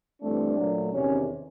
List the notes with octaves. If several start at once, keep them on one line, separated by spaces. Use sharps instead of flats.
G2 E3 A3 C4 D4
A#2 F#3 A3
E2 C3 D#3 C#4